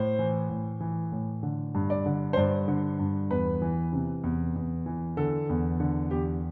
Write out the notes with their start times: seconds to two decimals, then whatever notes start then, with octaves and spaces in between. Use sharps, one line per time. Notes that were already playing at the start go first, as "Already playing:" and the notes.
Already playing: A2 C5
0.19 E3
0.50 A2
0.80 E3
1.12 A2
1.43 D3
1.75 G2
1.90 D5
2.06 D3
2.33 C5
2.37 G2 D5
2.68 D3
2.99 G2
3.30 E2 B4
3.62 E3
3.93 C3
4.24 E2
4.56 E2
4.86 E3
5.17 D3 A4
5.49 E2
5.80 D3
6.11 E2 G4